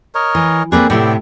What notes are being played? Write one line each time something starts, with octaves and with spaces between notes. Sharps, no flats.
A#4 C#5 D#5
E3
A#3 C4 G#4 B4 D5
A2 C3 B3 E4 D5 G5